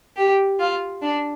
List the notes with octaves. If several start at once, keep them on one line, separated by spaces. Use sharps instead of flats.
G4
F4
D4